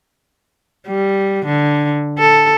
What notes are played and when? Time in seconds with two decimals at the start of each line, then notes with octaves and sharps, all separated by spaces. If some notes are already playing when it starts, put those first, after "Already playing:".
0.87 G3
1.45 D3
2.19 A4